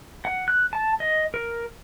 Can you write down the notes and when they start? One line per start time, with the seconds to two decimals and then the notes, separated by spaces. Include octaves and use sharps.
0.25 F#5
0.48 F#6
0.73 A5
1.00 D#5
1.34 A#4